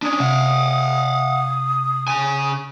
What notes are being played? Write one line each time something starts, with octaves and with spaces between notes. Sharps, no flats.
C#4 D4 D#6
C3 F5 F#5
C#3 G#5